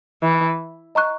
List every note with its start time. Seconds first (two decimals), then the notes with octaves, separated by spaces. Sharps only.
0.22 E3
0.95 D#5 A#5 C#6 F#6